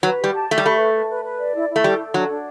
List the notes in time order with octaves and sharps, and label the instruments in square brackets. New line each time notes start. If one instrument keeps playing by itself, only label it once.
[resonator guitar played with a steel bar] F#3 [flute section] B4
[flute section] G4
[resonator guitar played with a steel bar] G3
[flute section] A5
[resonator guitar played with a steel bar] A3 [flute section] G4
[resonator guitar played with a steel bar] G3
[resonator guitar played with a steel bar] A3 [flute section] B5
[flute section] B4
B4
B4
B4
D5
E4
E4
[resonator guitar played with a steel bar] A3
[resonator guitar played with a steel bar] G3 [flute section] A4
[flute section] A4
[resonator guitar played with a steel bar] F#3 [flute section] D4
[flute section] D4